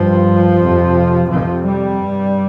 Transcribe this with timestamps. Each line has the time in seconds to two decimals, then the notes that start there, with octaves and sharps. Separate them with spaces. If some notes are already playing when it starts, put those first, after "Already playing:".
Already playing: G2 F3
0.60 F2 C3
1.29 F2 C3 F3
1.63 G3
1.97 G2